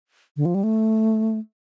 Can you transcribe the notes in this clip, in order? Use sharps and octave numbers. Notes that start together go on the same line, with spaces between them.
D3
F3
G3
A3